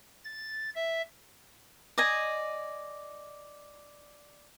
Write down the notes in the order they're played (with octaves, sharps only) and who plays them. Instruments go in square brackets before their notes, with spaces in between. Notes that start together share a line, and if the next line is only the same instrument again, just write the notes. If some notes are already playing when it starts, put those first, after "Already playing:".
[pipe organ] A6
E5
[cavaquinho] D5 D#5 G#5